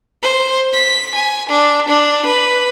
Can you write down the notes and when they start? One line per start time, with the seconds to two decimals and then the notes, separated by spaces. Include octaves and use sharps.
0.23 C5
0.73 B6
1.14 G#5
1.49 D4
1.88 D4
2.26 B4